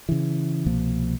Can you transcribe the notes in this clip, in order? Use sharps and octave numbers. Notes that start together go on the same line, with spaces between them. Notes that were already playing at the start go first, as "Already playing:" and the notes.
C#3 E3
C2 B2 F3 A#3